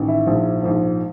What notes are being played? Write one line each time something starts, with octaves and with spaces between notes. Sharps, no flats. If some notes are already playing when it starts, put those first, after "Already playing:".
Already playing: A1 D#3
E4
A#1 G#2 F3
A#1 G#2 F3